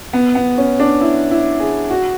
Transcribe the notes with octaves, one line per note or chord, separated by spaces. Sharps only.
B3
B3
C#4
D4
E4
E4
G#4
F#4